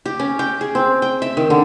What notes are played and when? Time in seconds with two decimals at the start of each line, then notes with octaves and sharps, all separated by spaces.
0.06 G4
0.20 C#4
0.39 G5
0.61 G#4
0.75 C4
1.02 G5
1.22 E5
1.37 D#3
1.50 D3